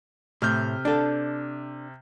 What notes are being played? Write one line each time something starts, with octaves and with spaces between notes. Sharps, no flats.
A2 C3 F6 G6
D4 A4